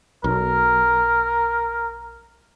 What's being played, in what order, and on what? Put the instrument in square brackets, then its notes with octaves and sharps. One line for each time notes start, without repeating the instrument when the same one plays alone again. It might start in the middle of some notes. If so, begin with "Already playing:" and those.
[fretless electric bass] B1 [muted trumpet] A#4